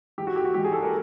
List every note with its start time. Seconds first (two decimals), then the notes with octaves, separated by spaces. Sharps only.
0.18 G#2 E3 G#3 G4
0.27 F#4
0.36 G4
0.45 F#4
0.54 G#2 E3 G#3 G4
0.65 G#4
0.73 A4
0.83 A#4